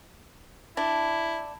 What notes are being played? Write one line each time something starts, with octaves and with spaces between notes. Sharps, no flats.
D4 E4